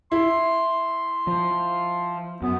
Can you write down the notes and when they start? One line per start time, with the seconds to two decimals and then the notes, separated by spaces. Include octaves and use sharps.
0.12 E4 C6
1.27 F3
2.42 F#2 B3